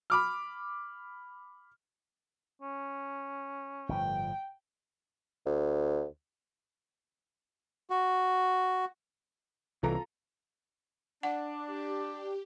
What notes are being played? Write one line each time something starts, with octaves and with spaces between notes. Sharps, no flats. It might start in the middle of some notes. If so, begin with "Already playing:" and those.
B5 D6 F6
C#4
G1 A2 F3 G5
D2
F#4
C2 E3 F4 A4 A#5
D4 F#5
G4